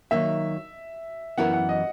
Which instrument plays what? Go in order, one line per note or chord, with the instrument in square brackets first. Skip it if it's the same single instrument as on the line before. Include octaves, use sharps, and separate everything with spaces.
[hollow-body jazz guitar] D#3 F#3 A#3 D#4 [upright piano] E5
[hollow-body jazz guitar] F#2 E3 B3 E4 A#4 [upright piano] F#5
[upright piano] F#5
D#5